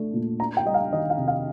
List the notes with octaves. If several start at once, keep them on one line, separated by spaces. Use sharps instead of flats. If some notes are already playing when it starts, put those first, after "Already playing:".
Already playing: A3 D4
A#2
D4 A#5
G5
G3 D#5
F5
D#3 D#5
F5
C3
F5